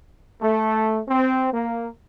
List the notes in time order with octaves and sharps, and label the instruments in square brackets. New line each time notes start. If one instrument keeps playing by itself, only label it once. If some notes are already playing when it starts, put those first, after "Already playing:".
[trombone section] A3
C4
A#3